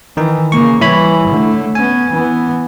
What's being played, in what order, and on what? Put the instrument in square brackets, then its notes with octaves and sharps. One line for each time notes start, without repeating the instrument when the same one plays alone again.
[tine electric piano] D#3 D#4 [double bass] E3
[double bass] C#3 A#3 [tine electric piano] C#6
[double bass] E3 G3 [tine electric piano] E4 C#5 B5
[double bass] D3 A3
[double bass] B3 C#4 [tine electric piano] G#5
[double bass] E3 B3